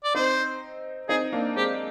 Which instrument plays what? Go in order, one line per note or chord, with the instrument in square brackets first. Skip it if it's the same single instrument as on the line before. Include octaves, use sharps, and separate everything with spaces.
[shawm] D5
[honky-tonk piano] C4 D#4 [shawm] C5
[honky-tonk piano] C4 D#4 [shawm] G#4
[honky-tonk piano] A#3 D4
[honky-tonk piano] G#3 C4 [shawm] G4